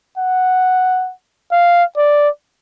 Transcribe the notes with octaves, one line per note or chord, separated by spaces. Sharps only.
F#5
F5
D5